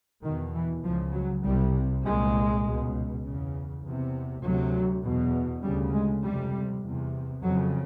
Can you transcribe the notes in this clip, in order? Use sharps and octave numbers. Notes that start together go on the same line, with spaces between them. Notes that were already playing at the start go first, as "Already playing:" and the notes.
E2 B2 D#3
E3
C#2 C#3 F3
F#3
C2 C3 G3
C2 A#2 G#3
C#2 B2
E2 C#3
E2 C3
D2 C3 F#3
E2 B2
D2 C#3 G3
G#3
F2 C3 G3
E2
C3
F2 C#3 F#3